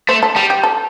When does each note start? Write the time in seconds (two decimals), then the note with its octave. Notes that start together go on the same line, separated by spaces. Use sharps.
0.09 A3 C5
0.23 A4
0.36 G3 G4
0.50 G4
0.63 A4